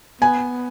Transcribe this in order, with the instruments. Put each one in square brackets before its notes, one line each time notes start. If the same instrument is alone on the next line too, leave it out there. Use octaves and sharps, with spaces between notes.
[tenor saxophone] B3 [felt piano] G#5